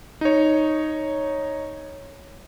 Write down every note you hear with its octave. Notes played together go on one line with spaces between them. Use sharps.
D#4 C#5